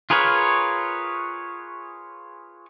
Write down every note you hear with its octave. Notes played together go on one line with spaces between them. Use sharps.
F4 G#4 A#4 B4 C#5